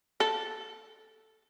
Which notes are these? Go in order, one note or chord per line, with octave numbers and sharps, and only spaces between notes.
A4